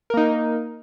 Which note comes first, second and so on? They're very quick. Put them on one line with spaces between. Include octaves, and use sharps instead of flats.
A#4 A#3 D#4